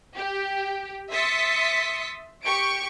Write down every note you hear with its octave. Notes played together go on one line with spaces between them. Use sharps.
G4
E5 C6 D#6 A6 B6 C#7
G4 C#6 D7